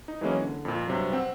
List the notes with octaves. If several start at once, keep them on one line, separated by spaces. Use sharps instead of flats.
D#4
E3 F#3 G#3 A#3 C#4
D3
F2 A#2
G2 C3 F#3
C4 F#5 E6